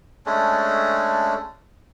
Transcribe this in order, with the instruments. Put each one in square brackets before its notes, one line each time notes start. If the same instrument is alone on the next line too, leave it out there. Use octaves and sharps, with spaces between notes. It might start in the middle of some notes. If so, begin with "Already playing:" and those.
[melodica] G#3 A3 C#4 D4